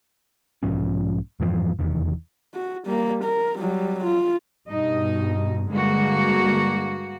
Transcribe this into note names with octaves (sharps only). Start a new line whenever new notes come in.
B1 G#2 F3 C#4
F2 G#2 E3 F3
F1 E2 D#3
F#4
G3 A#3
A#4
F#3 G3
F4
G2 B2 D#4 D#5
G2 D3 G#3 A#3 F#4